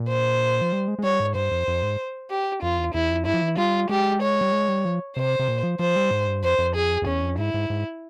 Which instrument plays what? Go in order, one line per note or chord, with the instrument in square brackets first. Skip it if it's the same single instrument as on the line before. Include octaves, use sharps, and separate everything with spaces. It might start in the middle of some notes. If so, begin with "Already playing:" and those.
Already playing: [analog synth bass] A#2
[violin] C5
[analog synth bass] F3
G3
G#3
G#3
[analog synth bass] G3 [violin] C#5
[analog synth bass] G#2
[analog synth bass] G2 [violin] C5
[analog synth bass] F2
F2
G#2
[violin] G4
[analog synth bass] F2 [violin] F4
[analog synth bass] E2
[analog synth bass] E2 [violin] E4
[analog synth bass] F2
[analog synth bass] G2 [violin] E4
[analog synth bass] F3
E3
[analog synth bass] G3 [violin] F4
[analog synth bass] G#3 [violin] G4
[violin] C#5
[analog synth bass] G3
G#3
G3
F3
[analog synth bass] C3 [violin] C5
[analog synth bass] C3
A#2
F3
[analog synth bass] F3 [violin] C5
[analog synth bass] G3
G#2
G2
[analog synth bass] F2 [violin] C5
[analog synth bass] F2
[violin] G#4
[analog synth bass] F2
[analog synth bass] E2 [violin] C#4
[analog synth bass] F2
[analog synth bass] G#2 [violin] E4
[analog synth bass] G#2
G#2